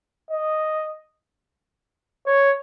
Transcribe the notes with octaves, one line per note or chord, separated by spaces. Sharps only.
D#5
C#5